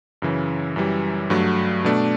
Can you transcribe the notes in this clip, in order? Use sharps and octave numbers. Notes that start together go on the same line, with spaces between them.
F#2 C#3 E3
F#2 E3 G3
G2 F#3 A3
B2 A3 D4